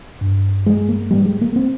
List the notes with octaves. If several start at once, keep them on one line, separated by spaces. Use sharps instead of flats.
G2
G#3
A#3
G#2 G3
G#3
A#3
C4